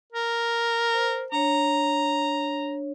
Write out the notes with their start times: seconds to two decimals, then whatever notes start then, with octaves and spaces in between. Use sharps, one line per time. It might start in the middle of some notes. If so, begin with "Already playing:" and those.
0.12 A#4
0.93 C5
1.32 D4 C#5 A#5